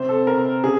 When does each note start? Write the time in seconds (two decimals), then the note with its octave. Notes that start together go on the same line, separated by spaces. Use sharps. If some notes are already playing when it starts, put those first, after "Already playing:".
Already playing: C3 C5
0.09 A4
0.27 C3 A#4
0.64 C#3 G#4